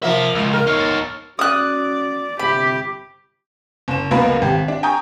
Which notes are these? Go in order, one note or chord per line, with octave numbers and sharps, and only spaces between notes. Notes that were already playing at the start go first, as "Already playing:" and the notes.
C3 F3 A#3 E5
C#2 E6 D#7 F7
A#4 F6
D#4 C#5 F6 C7
A6 A#6
C#4 F#4 D5 D#6 F#6
G1 C3 G4 B5
F#1 E7
C#2 F#3 A#3 B3 A#4 B5
G#1 G4
D4
G5 G#5 A#5 C#6 D#6 G6